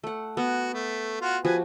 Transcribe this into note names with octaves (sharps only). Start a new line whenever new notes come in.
A3 F#5
B3 F#4
A3
F4 F#4 F#5
F3 F#4 G4 B4 G#5